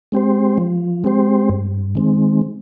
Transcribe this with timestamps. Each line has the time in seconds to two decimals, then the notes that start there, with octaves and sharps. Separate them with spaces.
0.12 G#3 C4 G4 C5
0.58 F3
1.04 G#3 C4 G4 C5
1.49 G2
1.95 D#3 G#3 C4